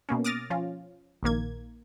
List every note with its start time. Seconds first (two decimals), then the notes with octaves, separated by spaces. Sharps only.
0.09 B2 A#3 C#4
0.24 D6 D#6 F6 A6 A#6
0.50 F3 C#4 F4
1.23 A#1 D#3 A#3 G#6